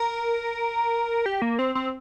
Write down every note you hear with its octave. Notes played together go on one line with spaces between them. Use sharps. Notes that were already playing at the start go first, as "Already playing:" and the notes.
Already playing: A#4
G4
A#3
C4
C4